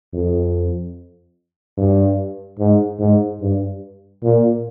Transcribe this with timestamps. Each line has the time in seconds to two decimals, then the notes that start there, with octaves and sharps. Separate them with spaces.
0.14 F2
1.77 G2
2.59 G#2
2.99 G#2
3.41 G2
4.23 A#2